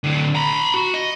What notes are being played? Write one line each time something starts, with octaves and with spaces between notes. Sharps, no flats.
A2 D3
A#5 B5
F#4
D#5